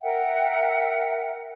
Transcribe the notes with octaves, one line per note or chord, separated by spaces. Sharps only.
A#4 E5 F#5 G5